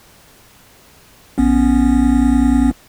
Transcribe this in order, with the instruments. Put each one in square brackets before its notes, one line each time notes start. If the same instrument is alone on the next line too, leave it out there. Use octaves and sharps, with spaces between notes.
[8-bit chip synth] A#1 B3 C#4